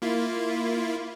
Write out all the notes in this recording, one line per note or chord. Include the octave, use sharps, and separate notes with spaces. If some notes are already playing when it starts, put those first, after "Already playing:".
A#3 E4 F4